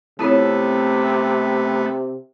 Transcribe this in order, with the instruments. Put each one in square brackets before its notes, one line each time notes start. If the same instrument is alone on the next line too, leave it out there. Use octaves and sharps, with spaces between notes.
[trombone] C3 [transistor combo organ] A3 B3 [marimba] C4 E4 F4 [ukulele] A4 C#5